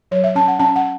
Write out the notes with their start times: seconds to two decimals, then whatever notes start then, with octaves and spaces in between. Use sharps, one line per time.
0.11 F#3 C#5
0.24 E5
0.35 C#4 A5
0.48 F#5
0.59 C#4 A5
0.76 F#5